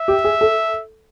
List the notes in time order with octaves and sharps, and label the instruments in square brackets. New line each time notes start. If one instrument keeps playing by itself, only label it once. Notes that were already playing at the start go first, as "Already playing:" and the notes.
Already playing: [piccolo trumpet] E5
[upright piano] G4
G#4
A4